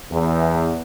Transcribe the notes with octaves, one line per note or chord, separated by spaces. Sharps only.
E2